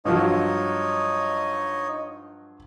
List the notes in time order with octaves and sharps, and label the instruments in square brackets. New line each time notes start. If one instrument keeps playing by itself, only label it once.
[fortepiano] G2 F3 F#3 [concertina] D#4 C#5 D#5